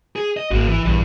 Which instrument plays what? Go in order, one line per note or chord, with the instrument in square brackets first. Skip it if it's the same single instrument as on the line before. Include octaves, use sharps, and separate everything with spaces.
[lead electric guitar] G#4
D#5
[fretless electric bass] G#1 [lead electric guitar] A#3 F#4
[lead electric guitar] E3 E4
[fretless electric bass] A#1 E3 [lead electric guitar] G2